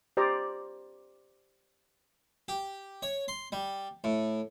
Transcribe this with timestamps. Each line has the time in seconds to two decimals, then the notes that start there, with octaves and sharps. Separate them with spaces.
0.17 G4 C5 D5 A#5
2.48 G4
3.03 C#5
3.28 C6
3.52 G3
4.04 A2